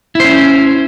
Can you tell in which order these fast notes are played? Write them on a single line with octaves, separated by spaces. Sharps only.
E4 C5 C#4